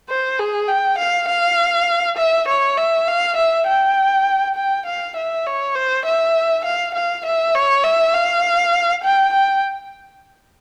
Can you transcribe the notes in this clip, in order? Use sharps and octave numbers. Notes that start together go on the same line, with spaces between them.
C5
G#4
G5
F5
F5
E5
C#5
E5
F5
E5
G5
G5
F5
E5
C#5
C5
E5
F5
F5
E5
C#5
E5
F5
G5
G5